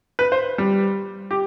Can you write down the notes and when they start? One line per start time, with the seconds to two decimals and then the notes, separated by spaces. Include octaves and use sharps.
0.19 B4
0.32 C5
0.58 G3
1.31 G4